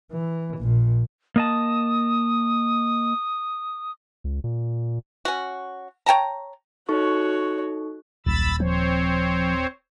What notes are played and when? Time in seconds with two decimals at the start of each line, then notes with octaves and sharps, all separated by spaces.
0.12 E3
0.58 A#1 A#2
1.36 A#3 D#5 A5 D#6
4.24 C#2
4.44 A#2
5.25 C#4 F#4
6.06 C#5 G5 A5 A#5
6.89 D#4 F#4 A4 C#5 C#6
8.26 D#1 B1 B5 E6 A6
8.60 F3 C4 C5 C#5